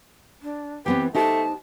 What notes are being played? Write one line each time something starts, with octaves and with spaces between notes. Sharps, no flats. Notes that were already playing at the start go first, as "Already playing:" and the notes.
D4
E3 B3 C4 G4 B4
A3 D#4 G4 C5 A5